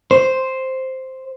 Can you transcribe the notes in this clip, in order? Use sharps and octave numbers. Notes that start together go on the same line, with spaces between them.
C5